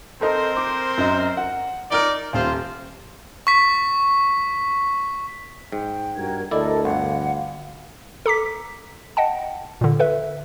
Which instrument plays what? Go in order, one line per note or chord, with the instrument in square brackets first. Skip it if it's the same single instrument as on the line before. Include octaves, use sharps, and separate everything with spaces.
[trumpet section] C4 A#4 C5 [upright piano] A4 D#5
[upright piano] D6
F#2 D#5
F#5
[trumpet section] D#4 A#4 D5 [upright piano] F6 D7 G7
[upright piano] D#1 [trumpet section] F4 C5
[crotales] C#6 B6
[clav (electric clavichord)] G#2 [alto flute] G5
[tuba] G2 [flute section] F#4 A#4 G#6
[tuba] D2 [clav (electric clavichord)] E4 D5 [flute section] A4 A#4 D#5
[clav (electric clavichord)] G1 [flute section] F5 [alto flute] F#5
[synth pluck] A4 A#5 D6 B6
D#5 F#5 G5 A5
A#2 D3
A4 B4 E5